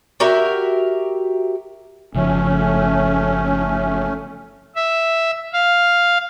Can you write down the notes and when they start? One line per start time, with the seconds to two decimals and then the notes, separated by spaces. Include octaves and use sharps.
0.20 F#4 G4 A#4 E5
2.15 G1 C#3 F3 A3 C#4
4.76 E5
5.53 F5